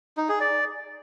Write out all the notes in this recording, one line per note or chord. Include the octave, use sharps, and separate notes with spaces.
D#4
G#4
D5